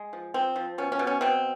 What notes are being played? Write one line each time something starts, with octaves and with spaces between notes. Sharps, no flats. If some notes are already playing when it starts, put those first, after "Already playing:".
Already playing: G#3
F3
F3 C4
F3
B2 C#4
C#4
B2
C#4
B2 C4